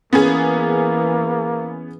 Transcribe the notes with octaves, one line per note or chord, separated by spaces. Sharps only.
E3 A#3 B3 C#4 G#4